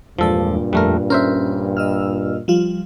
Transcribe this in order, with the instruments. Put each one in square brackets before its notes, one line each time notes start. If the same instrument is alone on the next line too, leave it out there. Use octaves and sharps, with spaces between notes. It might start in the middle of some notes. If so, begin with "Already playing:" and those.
[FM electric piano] E2 G#3 D5 [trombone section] G2 A#2 [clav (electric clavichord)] F3 A4
[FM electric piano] F2 [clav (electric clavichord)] G3 A3 A#4
[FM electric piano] C#4 [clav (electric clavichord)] A#4 C5 E5
[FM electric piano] D#5 E6 F6
F3 G3 F4